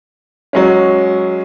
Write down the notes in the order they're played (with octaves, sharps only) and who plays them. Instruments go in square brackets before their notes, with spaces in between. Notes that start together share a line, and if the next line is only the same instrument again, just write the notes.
[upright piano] F#3 G#3 C#4